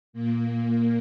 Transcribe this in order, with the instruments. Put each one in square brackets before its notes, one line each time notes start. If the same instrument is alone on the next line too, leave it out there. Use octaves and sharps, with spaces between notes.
[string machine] A#2 A#3